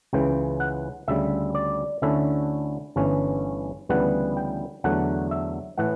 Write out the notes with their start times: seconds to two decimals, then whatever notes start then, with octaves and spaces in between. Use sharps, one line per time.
0.13 C#2 C#3 E3 G5
0.60 F#5
1.08 D2 C#3 G3 E5
1.55 D5
2.02 D2 D3 A3 C#4 E4 E5
2.96 G1 G2 E3 A3 C#4
3.89 D2 C#3 E3 G3 B3 F#5
4.37 G5
4.84 E2 D3 F#3 A3 F#5
5.31 E5
5.78 A2 E3 A3 F#5